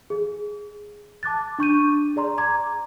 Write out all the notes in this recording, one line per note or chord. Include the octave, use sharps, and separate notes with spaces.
G#4
A5 D6 F#6 A6
D4 C#6 G6 D#7
G#4 D5 A#5 C6
A#5 D6 G#6